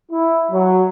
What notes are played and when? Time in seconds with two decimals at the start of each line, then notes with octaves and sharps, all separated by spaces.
0.12 E4
0.52 F#3